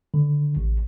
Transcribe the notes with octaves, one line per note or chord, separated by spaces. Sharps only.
D3
A1